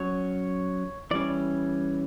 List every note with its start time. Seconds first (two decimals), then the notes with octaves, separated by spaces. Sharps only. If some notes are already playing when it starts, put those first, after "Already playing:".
Already playing: F#3 C#4 C#5
1.11 E3 G3 C#4 D5